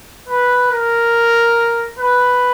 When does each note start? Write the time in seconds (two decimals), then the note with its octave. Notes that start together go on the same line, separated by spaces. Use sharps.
0.28 B4
0.71 A#4
1.99 B4